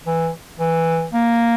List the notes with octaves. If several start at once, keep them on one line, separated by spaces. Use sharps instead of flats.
E3
E3
A#3